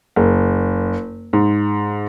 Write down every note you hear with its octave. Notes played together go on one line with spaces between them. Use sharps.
F#1
G#2